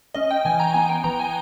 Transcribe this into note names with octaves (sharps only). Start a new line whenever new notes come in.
C#4 D#5
G5
E3 G#5
A#5
B3 G#5
G5
E3 A#5
G#5